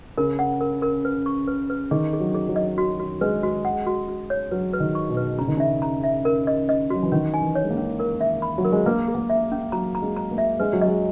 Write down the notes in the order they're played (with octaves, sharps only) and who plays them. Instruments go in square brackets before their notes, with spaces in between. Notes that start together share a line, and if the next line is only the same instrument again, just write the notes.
[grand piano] C#3 [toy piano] A#4
[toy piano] F#5
A#4
A#4
B4
C#6
B4
B4
[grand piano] D#3 [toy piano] G#4
[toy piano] G#4
[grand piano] F#3
[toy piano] G#4
[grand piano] F#3
[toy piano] D#5
F#4
F#4
[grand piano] G#3 [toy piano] B4
[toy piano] F#4
F#5
F#4
F#4
C#5
[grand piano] F#3 [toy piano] B4
[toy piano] B4
[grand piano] D#3
[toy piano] C#6
[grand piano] B2
[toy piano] B4
[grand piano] C#3 [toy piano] A#5
[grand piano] D#3
[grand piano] C#3 [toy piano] E5
[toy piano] A#5
E5
A#4
D#5
D#5
[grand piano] F#3 [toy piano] F#4
[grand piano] E3
[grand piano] D#3 [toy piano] C#4
[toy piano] G#5
[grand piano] E3
[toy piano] C#5
[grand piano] G#3
A#3
[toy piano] C#4
A#4
E5
B5
[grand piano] F#3
[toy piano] A#4
[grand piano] G#3
[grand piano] A#3 [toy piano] B4
[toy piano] G#4
[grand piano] A#3
[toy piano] E5
C#4
[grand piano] F#3 [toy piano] A#5
[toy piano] A#5
[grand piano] G#3
[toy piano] A#5
[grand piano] A#3
[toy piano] E5
[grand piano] G#3 [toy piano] B4
[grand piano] F#3
[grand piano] G#3 [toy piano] D#5